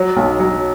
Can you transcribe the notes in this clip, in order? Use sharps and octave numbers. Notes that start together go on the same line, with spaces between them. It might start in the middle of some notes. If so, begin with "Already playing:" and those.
Already playing: F#3
B1
F#3